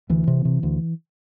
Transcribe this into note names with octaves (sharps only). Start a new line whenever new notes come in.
D2 E3
C3
C3
D2